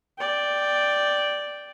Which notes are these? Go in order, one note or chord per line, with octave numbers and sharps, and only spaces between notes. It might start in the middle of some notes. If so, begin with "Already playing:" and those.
D5 G5